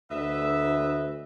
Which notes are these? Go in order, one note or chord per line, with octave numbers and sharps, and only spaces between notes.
D2 B4 D#5 E5